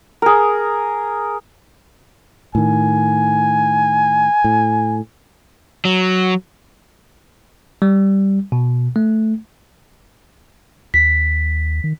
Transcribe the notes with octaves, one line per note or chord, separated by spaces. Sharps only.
G#4 A#4
A2 D#3 G#5
A2
F#3
G3
B2
A3
D#2 B6
D#3